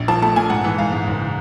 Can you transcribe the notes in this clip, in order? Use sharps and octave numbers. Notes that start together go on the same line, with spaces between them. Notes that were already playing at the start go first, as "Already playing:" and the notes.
Already playing: A#1
F3 A5
A3 A5
A#2 G#5
G#2 F#5
E3
G#2 F5
G#2
F#1